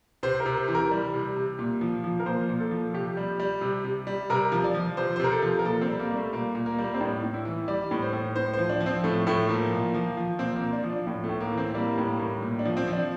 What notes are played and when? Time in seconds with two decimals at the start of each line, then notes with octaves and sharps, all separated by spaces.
0.23 C3 C5
0.40 A#4
0.46 C3
0.57 C5
0.68 E3
0.75 A#4
0.91 G3
1.13 C3
1.36 C3
1.59 A#2
1.81 F3
2.04 F3
2.20 A#4
2.26 A#2 C5
2.49 A#2
2.60 A4
2.71 F3
2.94 C3 G4
3.17 G3
3.39 G3
3.61 C3
3.84 C3
4.07 G3
4.30 C3 A#4
4.52 F3
4.64 D5
4.74 F3
4.97 C3 C5
5.16 C5
5.20 C3 A#4
5.32 A4
5.42 F3
5.59 A#4
5.65 A#2 A4
5.81 C4
5.88 G3
5.99 A#3
6.10 G3
6.16 A3
6.33 A#2 A#3
6.55 A#2
6.66 A#3
6.78 G3
6.84 A#3
6.94 C4
7.01 A2 D4
7.23 A2
7.34 E4
7.45 E3
7.68 G3 D5
7.91 A2
8.02 C5
8.13 A2
8.36 A2 C5
8.53 F3 C5
8.69 D4
8.80 F3
8.86 C4
9.04 A2 A3
9.27 A2 A3
9.48 F3 A#3
9.71 A#2
9.94 F3
10.17 F3
10.39 A#2 C4
10.56 A#3
10.61 A#2
10.73 D4
10.84 F3
10.90 D4
11.07 A2
11.24 A3
11.29 A2
11.40 A#3
11.52 E3
11.58 C4
11.74 G3 A#3
11.98 A2
12.08 A#3
12.20 A2
12.42 A#2
12.59 D4
12.65 F3
12.77 C4
12.88 F3
12.93 D4